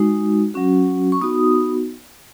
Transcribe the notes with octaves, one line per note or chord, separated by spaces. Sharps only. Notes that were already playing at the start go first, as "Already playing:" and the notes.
Already playing: G#3 D#4 F#4
F#3 C#4 F#4
C#6
B3 D#4 F#4 D#6